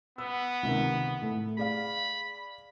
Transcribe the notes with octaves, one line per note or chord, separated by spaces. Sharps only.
B3 E6
C#2 C3 D#3
A2 A3
G#4 D5 F5 B5